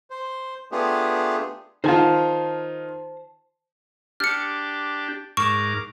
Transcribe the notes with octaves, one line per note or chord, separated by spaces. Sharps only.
C5
A3 B3 D4 F4 G4 G#4
D#3 F4 C5 G#5 A5
D4 G4 F6 C#7
G#2 A#4 C#6 D6 E7